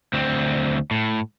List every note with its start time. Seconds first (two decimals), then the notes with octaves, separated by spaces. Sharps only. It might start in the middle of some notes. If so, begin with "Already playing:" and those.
0.13 D2 C4
0.91 A2